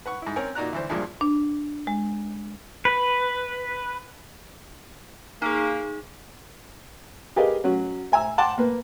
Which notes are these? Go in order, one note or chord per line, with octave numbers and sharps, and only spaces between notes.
B4 F#5 C#6
G#2 E4
C4 C#4 A#4 C#5 G#5
A#2 D#4 F#4 D5 A#5 F#6
D2 E3 C5
E2 G2 A#2 F3 G#3
D4
G#3
B4
A#3 D#4 G#4
G4 G#4 A#4 B4 D#5 F5
F#3 C#4 F#4
E5 G#5 A#5 E6
F#5 G5 A5 C6 D6
A#3 B4